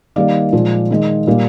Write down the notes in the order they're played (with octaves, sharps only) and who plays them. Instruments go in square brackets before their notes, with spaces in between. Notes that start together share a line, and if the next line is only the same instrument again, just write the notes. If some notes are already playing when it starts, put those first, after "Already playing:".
[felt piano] D#3 G3 A#3 D5 F5
A#2 F3 G#3
D#3 G#3
A#2 G3 A#3